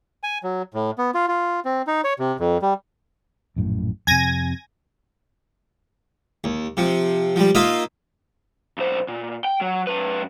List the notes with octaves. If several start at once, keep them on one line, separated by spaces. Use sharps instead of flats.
G#5
F#3
A2
B3
F4
F4
C4
D#4
C#5
C3
F2
G3
A#1 F#2 A2
F2 C3 G#5 G#6 A#6
D#2
C3 F3
F3 G3
A#3 D#4 F4 D#5 E5
B1 C5
A#2
G5
F#3
F#2 B4